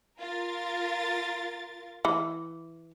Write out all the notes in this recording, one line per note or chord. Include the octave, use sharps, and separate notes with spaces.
F4 A#4 A6
E3